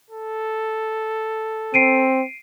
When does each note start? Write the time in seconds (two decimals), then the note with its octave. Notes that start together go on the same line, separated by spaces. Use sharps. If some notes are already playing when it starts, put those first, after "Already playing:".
0.10 A4
1.74 C4 C7 D7 D#7